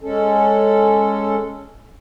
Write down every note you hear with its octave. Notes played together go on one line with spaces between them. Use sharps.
G#3 C#4 A4